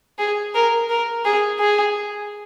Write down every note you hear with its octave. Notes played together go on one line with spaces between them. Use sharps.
G#4
A#4
A#4
G#4
G#4